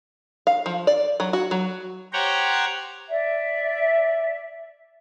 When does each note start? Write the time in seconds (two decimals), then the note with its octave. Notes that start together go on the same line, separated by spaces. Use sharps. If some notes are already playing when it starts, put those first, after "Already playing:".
0.47 F5
0.66 F3
0.87 D5
1.20 F#3
1.33 F#4
1.51 F#3
2.13 G4 C5 C#5 F#5 G5 A#5
3.10 D5 E5